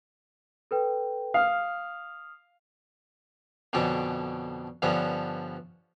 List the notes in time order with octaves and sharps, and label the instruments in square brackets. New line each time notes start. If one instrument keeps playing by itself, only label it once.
[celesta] A4 B4 G5
[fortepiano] F5 [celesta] D#6 F6
[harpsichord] F2 B2 D3 C#4 D4
G2 D3 F3 B3 C#4